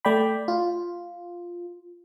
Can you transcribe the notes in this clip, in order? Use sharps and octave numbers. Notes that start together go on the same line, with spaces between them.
A3 D5 G5 B5
F4